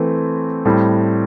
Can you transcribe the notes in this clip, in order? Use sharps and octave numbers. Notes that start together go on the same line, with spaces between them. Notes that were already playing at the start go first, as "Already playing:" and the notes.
Already playing: E3 A3 C4
A2 G3 C4